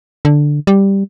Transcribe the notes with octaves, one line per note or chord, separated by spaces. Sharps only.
D3
G3